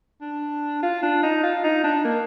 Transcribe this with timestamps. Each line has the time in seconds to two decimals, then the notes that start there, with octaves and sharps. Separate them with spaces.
0.22 D4
0.83 F4
1.03 D4
1.23 D#4
1.43 F4
1.64 D#4
1.84 D4
2.05 A#3